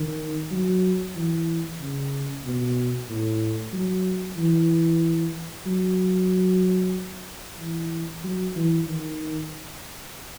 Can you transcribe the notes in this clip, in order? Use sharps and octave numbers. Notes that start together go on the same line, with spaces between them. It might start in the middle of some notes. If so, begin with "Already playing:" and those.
Already playing: D#3
F#3
E3
C#3
B2
A2
F#3
E3
F#3
E3
F#3
E3
D#3